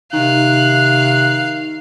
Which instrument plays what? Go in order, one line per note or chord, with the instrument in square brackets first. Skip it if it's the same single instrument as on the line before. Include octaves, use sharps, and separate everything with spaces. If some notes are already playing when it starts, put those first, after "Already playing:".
[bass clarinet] C3 [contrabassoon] D#3 [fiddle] F5 [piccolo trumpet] F#6